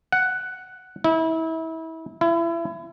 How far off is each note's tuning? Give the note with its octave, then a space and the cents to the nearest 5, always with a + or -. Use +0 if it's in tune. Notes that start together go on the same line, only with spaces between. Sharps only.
F#5 +5
E4 -30
E4 +30